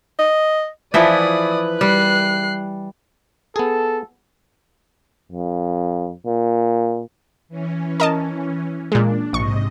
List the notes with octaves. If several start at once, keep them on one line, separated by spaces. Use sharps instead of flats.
D#5
E3 F3 E4 B4 D5 D#6
G3 F#6 C7
B3 G#4 A4
F2
A#2
E3 C#4
A#4 D#5 A5
A#2 G#3 D4
A#1 G#2 C3 D#5 C#6